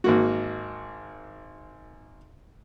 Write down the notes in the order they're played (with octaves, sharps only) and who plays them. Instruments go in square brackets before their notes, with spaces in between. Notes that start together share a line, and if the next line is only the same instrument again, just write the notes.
[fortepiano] G#1 A#3 F#4